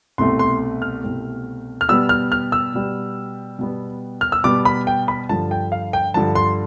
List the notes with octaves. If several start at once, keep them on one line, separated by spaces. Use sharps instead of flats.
C2 B2 A3 C4 C6
C6
F6
C2 B2 A3 C4
F6
B2 G3 B3 E6
F6
F6
E6
B2 G3 B3
B2 G3 B3
F6
E6
B2 G3 B3 D6
B5
G5
B5
G2 D3 F3 A5
G5
F5
G5
G2 D3 F3 A5
C6